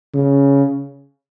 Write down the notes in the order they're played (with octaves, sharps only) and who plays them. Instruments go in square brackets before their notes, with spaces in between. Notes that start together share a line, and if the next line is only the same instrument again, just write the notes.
[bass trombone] C#3